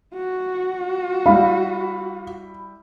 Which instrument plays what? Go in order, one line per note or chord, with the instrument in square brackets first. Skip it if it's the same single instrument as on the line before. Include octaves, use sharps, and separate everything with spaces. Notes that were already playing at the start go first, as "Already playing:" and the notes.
[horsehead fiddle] F#4
[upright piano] G3 E4 [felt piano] F5 [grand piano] B5